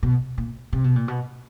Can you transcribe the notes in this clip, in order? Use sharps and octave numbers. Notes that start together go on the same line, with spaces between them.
B2
A#2
C3
B2
A#2
B2